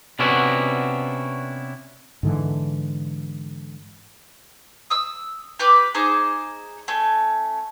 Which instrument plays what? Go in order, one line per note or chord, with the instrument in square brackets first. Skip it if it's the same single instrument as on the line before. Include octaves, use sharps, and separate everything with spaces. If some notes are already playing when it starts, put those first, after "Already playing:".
[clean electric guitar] C3 B3 C#4 D4 E4 F#4
[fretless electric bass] G#2 D3 E3
[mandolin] D#6 E6
G4 B4 D6
D#4 G#4 C5 D6
A3 C#4